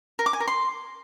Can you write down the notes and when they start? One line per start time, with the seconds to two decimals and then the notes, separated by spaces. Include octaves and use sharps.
0.19 A#4
0.26 D6
0.33 G#5
0.40 A#4
0.48 C6